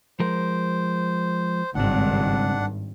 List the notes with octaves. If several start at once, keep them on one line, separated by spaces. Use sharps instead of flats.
F3 G#3 A#4 C5
G#1 C#2 G2 C4 D4 F#5